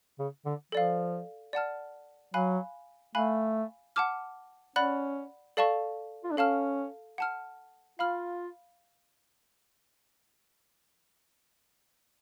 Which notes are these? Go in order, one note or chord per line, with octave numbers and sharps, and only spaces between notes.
C#3
D3
F3 A4 D5 F5
D5 F#5 A5 F6
F#3 F5 G#5 B5 F#6
A3 F5 G#5 B5 F#6
F#5 A5 D6 F6
C#4 D5 F#5 B5 F#6
A4 D5 F5 A5 C#6
F4
D4
C#4 A4 F5 A5 F6
F#5 A5 F6
F4 F5 B5 F6